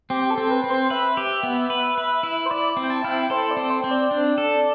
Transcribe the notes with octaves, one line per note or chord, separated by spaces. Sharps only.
C4 G4
A4
C4
B4
C4
C5
B4 E5
G4
B3
B4
B4
E4
C5
E4 D5
C4
G5
A5
E4 F5
G5
A4 C5
D5
C4
C5
C4
D5
D4
A4